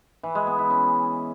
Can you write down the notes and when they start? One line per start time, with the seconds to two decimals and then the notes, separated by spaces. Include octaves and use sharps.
0.23 E3
0.35 G#3
0.47 B3
0.59 E4
0.70 C#4